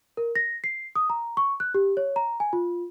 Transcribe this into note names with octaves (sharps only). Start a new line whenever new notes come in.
A#4
A#6
C7
D#6
A#5
C#6
F#6
G4
C#5
A#5
G#5
F4